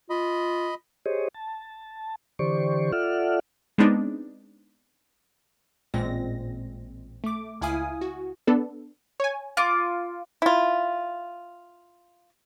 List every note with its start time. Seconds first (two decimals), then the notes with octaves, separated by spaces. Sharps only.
0.10 F4 D#5 B5
1.06 G4 G#4 C5 C#5 D#5
1.34 A5
2.39 D3 E3 G4 C5 D5 C#6
2.92 F4 A4 D5 E5 F#5 F6
3.78 G#3 B3 C4 D4 D#4
5.94 A1 A#2 G#3 C4 A#6
7.24 A3 D6
7.61 C#2 E4 F5 G#5 D#6
8.01 F#4
8.47 B3 D4 A4
9.20 C#5 G#5
9.57 F4 D6
10.42 E4 F4